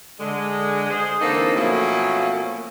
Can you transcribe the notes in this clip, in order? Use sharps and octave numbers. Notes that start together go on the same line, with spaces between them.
D3 G#3
G#4 C5
D3 E3 A#3 C4 D#4 A4
B2 F3 F#3 A3 A#3 C#4